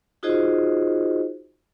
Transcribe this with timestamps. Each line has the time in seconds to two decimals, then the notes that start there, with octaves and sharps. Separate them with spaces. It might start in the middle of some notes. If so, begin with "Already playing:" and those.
0.23 D#4 F4 F#4 G#4 C5 D#5